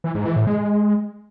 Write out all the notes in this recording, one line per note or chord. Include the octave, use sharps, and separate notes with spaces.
E3
G#2
E3
A2
G#3